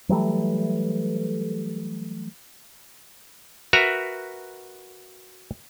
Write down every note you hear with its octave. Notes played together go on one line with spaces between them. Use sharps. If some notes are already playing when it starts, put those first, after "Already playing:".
E3 F#3 G3 A3
F#4 A#4 B4 E5 A#5